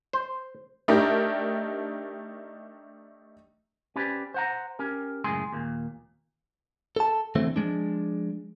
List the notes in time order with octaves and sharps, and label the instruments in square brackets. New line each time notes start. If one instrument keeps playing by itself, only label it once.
[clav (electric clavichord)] C5
[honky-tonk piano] A3 D4 D#4 G4 A#4
[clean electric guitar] C#4 G4 B4 C5 D5
C5 F#5 A#5
C#4 G4 A#4
C#2 F#2 A2 G#3 G#4 C6
D#2 A#2
A4 A5
D3 E3 A3 C4 C5
F3 G#3 D4